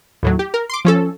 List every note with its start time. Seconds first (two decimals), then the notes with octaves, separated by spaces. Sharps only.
0.23 D#2 A2 F#3
0.39 G4
0.54 A#4
0.69 C6 D6
0.85 F3 C#4 A4